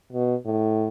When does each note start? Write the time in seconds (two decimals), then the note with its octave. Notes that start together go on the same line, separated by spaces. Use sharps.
0.12 B2
0.45 A2